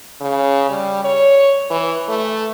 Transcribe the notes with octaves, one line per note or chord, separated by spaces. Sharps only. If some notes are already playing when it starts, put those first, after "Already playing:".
C#3
G3
C#5
E3
A3